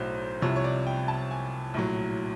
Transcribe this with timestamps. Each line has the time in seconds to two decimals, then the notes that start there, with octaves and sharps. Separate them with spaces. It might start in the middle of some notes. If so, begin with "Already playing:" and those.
Already playing: B1 A2 F#3 C5
0.42 C2 C3 F3 C#5
0.56 C#5
0.64 D5
0.87 G5
1.08 A5
1.31 G#5
1.74 A#1 A2 F#3